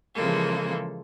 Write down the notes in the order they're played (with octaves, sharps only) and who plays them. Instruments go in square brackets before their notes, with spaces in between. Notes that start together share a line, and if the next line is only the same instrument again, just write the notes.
[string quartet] C#3 E3 F3 G#3 A#3 A4